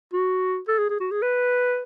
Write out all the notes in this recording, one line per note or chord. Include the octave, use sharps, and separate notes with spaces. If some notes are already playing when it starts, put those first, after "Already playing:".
F#4
A4
G#4
G#4
F#4
G#4
B4